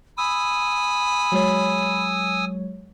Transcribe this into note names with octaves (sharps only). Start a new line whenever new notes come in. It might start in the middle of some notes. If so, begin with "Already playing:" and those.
G#5 B5 D#6 E6
F#3 G#3 C#5